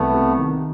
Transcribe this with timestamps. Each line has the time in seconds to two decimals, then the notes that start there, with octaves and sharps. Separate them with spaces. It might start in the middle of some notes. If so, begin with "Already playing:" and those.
Already playing: C2 A3 B3
0.14 C3
0.39 D#3